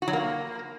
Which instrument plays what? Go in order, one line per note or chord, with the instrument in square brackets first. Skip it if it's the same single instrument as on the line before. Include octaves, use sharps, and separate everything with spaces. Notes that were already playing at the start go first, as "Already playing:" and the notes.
[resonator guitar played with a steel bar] F#4
F#3
A#3